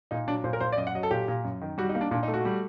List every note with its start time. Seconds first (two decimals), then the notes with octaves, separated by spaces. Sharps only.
0.11 A#2 D#4
0.28 F#3 D4
0.44 A#2 C5
0.53 A#4
0.61 A#2 C5
0.72 D5
0.77 F#2 D#5
0.87 F#5
0.95 F#3 D#5
1.03 A4
1.11 A#2 G4
1.28 A#2
1.44 F#2
1.61 D#3
1.78 G3 F#4
1.89 D#4
1.95 A#3
2.01 D4
2.11 A#2 D4
2.23 D#4
2.28 A3
2.34 F#4
2.45 G3